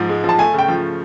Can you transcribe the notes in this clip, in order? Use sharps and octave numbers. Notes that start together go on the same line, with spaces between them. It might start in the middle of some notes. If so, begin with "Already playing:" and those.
Already playing: G#2 F3
G#3
F3 A5
A3 G#5
C#3
G5
F3